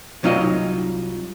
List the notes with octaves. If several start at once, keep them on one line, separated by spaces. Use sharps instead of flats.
C2 F#3 D#4 F4 D#5